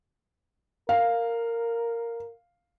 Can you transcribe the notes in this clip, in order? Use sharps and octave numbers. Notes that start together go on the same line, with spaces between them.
A#4 F5